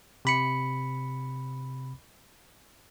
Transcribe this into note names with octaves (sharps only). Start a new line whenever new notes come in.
C3 B5 C#7